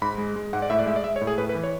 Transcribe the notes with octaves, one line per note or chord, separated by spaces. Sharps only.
G#2 B5
G#3
G#3
G#2 F#5
D5
A2 E5
D5
G#3 E5
D5
G#3 E5
C#5
A2
G#4
A2 B4
B4
E3
C#5